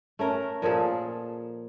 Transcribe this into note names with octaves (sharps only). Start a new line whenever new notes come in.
A3 C#4 A#4
A#2 F3 G#4 A4